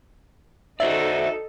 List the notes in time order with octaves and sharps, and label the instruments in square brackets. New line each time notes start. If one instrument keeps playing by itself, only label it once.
[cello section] D#4 A4 [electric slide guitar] F#4 C5 D5 [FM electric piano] E5